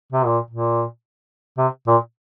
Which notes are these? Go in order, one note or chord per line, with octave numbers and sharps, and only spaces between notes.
C3
A#2
A#2
C3
A#2